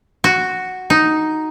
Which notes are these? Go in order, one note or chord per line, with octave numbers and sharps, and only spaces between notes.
F#4
D#4